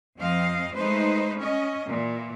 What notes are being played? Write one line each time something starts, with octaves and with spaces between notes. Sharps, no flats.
F2 F3 C4 D#5 F5
G#3 A3 D#4 B4 C5
C#4 D#5
A#2 E3